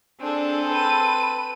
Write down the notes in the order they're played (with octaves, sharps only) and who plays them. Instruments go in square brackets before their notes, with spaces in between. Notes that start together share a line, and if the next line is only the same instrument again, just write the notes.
[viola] C4 A4 [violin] D4 G#4
[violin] B4 D#7